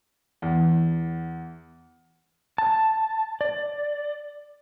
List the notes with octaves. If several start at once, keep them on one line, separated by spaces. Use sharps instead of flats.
E2
A5
D5